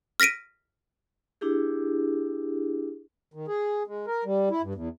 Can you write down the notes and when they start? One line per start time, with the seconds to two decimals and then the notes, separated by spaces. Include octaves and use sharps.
0.20 F6 A#6 B6 D7 D#7
1.41 D4 E4 G4 G#4
3.34 D#3
3.48 G#4
3.87 G#3
4.07 A#4
4.25 G3
4.50 E4
4.62 G2
4.75 E2